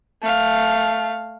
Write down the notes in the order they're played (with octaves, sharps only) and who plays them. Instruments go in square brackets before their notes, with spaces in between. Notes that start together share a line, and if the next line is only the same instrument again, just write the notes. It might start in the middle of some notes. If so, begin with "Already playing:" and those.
[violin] A3 F5